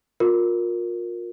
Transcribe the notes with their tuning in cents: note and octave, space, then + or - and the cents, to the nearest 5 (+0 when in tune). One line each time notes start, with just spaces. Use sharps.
F4 +30 A#4 +0